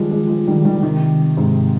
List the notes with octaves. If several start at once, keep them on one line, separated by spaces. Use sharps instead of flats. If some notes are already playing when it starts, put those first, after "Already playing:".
Already playing: D#3 F3 G3 G#3
F3 G#3
F3 G#3
D#3 G3
D#3 G3
C3 D#3
G#2 C3